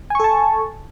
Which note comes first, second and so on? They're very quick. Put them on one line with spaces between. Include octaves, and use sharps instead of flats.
G#5 C#6 A4 A5